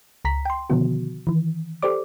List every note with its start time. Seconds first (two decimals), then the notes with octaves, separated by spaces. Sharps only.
0.25 C#2 A#5 B6
0.45 G5 C6
0.70 B2 D3 D#3 F3 B3 F#4
1.27 D#3 E3
1.83 G4 A4 C5 D5 D6